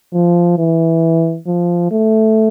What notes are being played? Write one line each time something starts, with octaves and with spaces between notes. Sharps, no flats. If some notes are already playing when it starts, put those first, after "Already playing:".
F3
E3
F3
A3